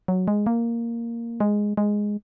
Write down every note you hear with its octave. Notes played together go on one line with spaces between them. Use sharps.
F#3
G#3
A#3
G#3
G#3